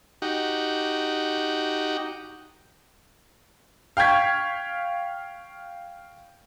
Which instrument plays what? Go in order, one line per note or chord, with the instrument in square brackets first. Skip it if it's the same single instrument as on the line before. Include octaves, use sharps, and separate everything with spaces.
[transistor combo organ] D#4 F#4 G4
[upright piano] F5 G5 C#6 G#6 B6